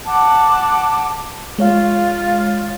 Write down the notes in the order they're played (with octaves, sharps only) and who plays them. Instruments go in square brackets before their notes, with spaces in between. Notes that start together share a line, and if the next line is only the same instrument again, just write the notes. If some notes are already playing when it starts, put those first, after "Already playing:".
[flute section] F#5 A5 D6
[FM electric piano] G#3 C#5 F5 [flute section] F4